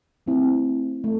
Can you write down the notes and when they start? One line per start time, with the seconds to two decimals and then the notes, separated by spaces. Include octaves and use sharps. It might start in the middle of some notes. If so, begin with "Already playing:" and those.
0.26 A3 C4 E4
1.04 A3